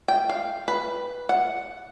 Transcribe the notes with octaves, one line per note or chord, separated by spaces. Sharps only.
G5
F5
B4
F#5